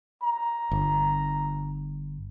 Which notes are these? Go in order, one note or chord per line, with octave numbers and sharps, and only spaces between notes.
A#5
G1